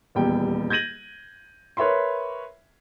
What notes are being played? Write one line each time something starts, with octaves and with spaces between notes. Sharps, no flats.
D#1 E2 G3 G5
G6 G#6 A#6 D#7 F#7
A#4 B4 C#5 E5 B5 C6